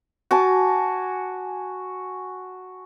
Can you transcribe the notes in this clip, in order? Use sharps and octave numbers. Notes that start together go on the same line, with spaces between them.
F#4 G#5 A5 D6